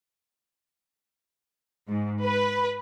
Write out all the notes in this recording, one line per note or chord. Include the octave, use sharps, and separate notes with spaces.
G#2
B4